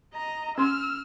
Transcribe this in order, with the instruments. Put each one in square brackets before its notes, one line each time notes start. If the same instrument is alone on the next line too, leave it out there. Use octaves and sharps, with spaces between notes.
[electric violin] D#5 A#5
[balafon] C#4 C6 [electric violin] E6 F6